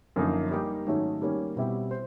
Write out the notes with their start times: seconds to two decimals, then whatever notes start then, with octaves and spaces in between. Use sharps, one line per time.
0.16 F#2 D3 F3 A#3 D#4
0.51 G3 A#3 D#4 G4
0.86 G#2 D#3 F#3 A3 C#4
1.21 D#3 G3 A#3 C#4
1.56 B2 G3 C4 E4 G4
1.91 C5